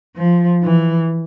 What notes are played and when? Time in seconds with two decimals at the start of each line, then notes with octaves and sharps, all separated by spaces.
0.16 F3
0.63 E3